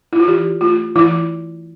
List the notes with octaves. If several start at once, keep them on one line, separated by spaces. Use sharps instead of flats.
E4
F4
E3 G4
A3 F4
E3 E4